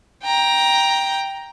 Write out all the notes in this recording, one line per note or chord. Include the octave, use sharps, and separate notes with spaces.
G5 A#5